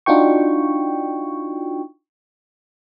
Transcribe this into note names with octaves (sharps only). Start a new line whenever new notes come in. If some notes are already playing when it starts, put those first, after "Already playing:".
D4 D#4 F4 F#4 G5 C#6